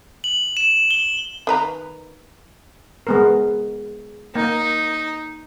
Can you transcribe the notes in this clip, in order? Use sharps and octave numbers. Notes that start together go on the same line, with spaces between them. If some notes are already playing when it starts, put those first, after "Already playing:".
F#7
E7
G7
D#3 B4 A#5
G#3 B3 A#4
A#3 D#4